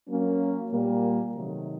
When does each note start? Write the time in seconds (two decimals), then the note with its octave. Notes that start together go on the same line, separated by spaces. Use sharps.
0.09 F#3 A#3 C#4
0.71 A#2 G3 A#3
1.33 C3 D#3 F#3 A3